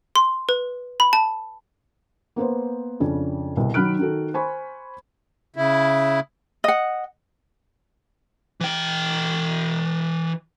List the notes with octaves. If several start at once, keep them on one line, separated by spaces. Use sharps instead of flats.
C6
B4
B5
A5
A#3 B3 B4 C5
F2 C#3 C#4 D4
C2 B2
D#3 F#3 B5 F6 F#6 D7
D#3 F#4 A4
C5 G#5 B5 C#6
C#3 E4
D#5 F#5
E3 G5